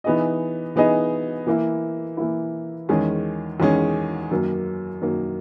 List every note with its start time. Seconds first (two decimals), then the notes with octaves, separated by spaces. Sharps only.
0.04 E3 B3 D#4 G#4 D#5
0.76 E3 B3 D#4 G#4 D#5
1.47 E3 A#3 E4
2.17 E3 A#3 E4
2.89 E2 D#3 G#3 C#4 G#4
3.60 E2 D#3 G#3 C#4 G#4
4.31 F#2 D#3 F#3 A#3
5.02 F#2 D#3 F#3 A#3